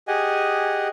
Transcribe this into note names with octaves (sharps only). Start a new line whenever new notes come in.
G4 G#4 D#5 F#5 G#5